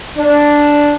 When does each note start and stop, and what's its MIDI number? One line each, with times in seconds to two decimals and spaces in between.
0.18 0.94 62